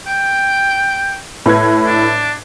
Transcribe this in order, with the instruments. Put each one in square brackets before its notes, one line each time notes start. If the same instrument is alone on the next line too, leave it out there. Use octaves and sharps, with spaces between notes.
[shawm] G5
[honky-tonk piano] A2 B4 G#6
[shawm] D4